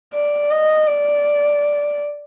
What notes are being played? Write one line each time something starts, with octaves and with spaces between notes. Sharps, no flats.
D5
D#5
D5